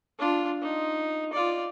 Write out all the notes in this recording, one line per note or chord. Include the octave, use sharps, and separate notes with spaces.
D4 F4
D#4
F4 D5